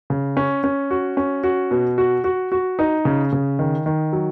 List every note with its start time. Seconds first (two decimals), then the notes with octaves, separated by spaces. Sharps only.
0.10 C#3
0.37 C#4
0.64 C#4
0.91 F#4
1.17 C#4
1.44 F#4
1.71 B2
1.98 F#4
2.24 F#4
2.52 F#4
2.79 D#4
3.05 C#3
3.32 C#3
3.59 D#3
3.86 D#3
4.13 F#3